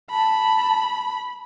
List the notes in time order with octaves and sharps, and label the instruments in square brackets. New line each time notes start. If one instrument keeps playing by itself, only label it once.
[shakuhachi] A5 [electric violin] B5